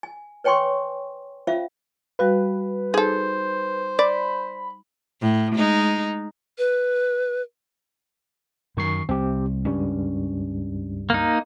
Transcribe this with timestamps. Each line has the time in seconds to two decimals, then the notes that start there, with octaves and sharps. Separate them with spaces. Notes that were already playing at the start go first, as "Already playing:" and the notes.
0.03 G#5
0.44 B4 C#5 G5 G#5 C6 C#6
1.47 C#4 F4 C5 E5 F5
2.19 G3 F#4 B4 F5
2.94 D#4 G#4 A4 C5
3.99 D5 B5
5.22 A2
5.56 G#3 D#4
6.58 B4
8.77 F#2 D#3 C#6 C7
9.09 C2 C4 G4
9.65 C#2 G2 G3 C#4
11.10 A#3 D#4